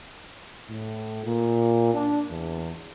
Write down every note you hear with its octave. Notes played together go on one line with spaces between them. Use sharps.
A2
A#2
D4
E2